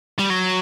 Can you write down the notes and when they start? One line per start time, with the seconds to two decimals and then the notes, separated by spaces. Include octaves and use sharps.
0.19 G3
0.30 F#3